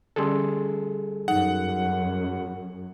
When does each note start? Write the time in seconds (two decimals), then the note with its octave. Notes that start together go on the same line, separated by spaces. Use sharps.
0.16 D3 G3 C#4 G#4 A4 C6
1.28 F#2 D#4 F#5